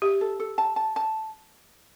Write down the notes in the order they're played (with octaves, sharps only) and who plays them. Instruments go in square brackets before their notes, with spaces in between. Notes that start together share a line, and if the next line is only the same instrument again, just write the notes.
[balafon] G4 [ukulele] E5
[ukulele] A4
A4
A5
A5
A5